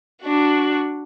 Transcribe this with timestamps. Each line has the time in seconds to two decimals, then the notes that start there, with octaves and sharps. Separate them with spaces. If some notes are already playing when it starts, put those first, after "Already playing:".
0.23 D4 F#4